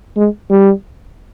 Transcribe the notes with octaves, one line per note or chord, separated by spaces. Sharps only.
G#3
G3